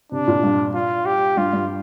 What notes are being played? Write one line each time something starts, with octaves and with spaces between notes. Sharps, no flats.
C3 D4
A#2
G2
F4
G4
G2 F4
G2